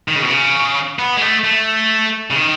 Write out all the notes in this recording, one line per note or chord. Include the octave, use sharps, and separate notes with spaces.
D#3
C#3
B2
C#3
B3
G#3
A3
A3
C#3
D#3